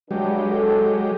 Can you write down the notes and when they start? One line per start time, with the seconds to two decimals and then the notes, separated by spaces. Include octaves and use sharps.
0.11 G2 F#3 G#3 G4
0.52 A4